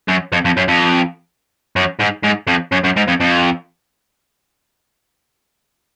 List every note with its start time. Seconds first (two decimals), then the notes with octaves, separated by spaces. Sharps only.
0.09 F#2
0.33 F2
0.45 F2
0.57 F#2
0.68 F2
1.76 F#2
1.99 G#2
2.23 G#2
2.47 F2
2.72 F#2
2.84 F#2
2.96 G#2
3.08 F2
3.20 F2